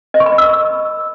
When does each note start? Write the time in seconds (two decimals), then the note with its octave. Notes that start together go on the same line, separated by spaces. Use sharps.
0.14 D#5
0.20 C#6
0.26 B5
0.32 D#5
0.38 E6